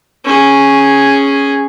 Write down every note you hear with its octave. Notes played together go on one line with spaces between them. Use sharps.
C#4 G#4